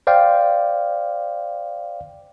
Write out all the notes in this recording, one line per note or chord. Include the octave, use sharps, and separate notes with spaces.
C5 D5 F5 G5